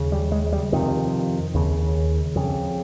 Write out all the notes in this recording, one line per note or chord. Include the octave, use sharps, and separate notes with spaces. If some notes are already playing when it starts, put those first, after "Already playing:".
Already playing: D#2 C#3
G3
G#3
G3
F2 C3 D#3
D#2 C#3
F2 C#3